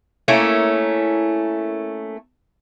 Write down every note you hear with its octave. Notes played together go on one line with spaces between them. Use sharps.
A3 A#3 C#4 E4